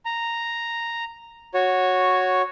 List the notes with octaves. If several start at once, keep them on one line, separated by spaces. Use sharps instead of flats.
A#5
F#4 C#5